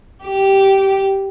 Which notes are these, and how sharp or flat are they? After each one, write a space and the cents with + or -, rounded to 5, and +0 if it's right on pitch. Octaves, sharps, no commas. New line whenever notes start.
G4 -10